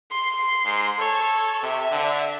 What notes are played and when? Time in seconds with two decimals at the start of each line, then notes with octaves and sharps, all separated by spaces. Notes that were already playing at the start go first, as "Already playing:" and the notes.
0.11 C6
0.65 G#2
0.99 A4 C#5
1.63 C3 E5
1.91 D3